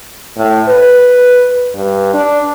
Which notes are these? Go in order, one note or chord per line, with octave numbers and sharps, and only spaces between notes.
A2
B4
G2
D4